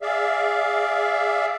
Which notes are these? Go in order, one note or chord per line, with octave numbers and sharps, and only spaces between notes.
G#4 D5 E5 F5